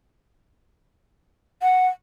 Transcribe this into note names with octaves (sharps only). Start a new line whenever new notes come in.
F#5